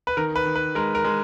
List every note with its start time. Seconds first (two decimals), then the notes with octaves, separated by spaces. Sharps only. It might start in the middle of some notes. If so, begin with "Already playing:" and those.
0.07 B4
0.17 D#3 A#4
0.36 B4
0.45 D#3
0.56 B4
0.75 G#3 A#4
0.95 A#4
1.05 G#3